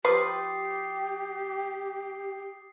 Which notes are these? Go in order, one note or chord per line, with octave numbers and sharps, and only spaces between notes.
F3 G4 B4 D6 D#6 A6 C7